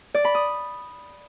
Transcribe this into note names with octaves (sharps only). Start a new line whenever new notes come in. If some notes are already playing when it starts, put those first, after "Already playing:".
D5
B5
D#6